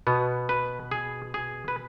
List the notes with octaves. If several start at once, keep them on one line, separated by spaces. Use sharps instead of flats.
B2 B3
B4
G#4
G#4
B4